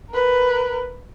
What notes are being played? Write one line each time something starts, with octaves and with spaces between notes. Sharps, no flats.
A#4 B4